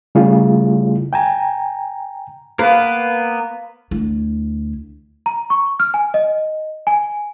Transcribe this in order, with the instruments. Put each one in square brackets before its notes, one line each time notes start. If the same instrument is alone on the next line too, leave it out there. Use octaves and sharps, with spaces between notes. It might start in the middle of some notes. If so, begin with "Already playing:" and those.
[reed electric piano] C#3 G3 A3 E4 F4 G#4
G5 G#5 A#5
[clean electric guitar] A#3 B3 [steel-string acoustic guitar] B4 F5
[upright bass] D2 E4
[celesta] A#5
C#6
F6
G#5
D#5
G#5